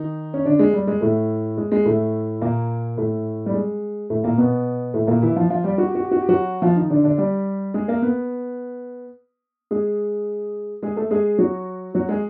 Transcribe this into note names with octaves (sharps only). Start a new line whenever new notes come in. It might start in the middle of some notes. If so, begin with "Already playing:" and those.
Already playing: D#3 D#4
C#4
D3 D4
G#3
G3
G#3
A2 A3
G#3
G#3
A2 A3
A#2 A#3
A2 A3
G3
G#3
A2 A3
A#2 A#3
B2 B3
A2 A3
A#2 A#3
E3 E4
F3 F4
F3 F4
G3 G4
F#4
G4
F#4
G4
F#4
G4
F#3 F#4
F3 F4
D#3 D#4
D3 D4
D3 D4
G3 G4
G#3 G#4
A#3 A#4
B3 B4
G#3 G#4
G#3 G#4
A3 A4
G#3 G#4
F#3 F#4
F#3 F#4
G#3 G#4